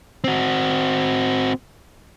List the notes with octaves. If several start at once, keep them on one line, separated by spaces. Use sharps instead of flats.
C4 F#4